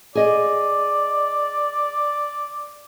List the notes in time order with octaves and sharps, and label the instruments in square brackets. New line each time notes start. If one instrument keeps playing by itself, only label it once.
[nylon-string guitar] G#4 D#5 [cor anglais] D5